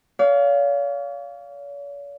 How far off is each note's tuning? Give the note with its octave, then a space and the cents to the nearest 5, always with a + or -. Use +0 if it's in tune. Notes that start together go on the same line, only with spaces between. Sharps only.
C#5 +45 F5 +0